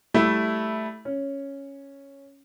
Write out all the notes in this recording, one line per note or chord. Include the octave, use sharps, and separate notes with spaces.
G3 A3 E4
C#4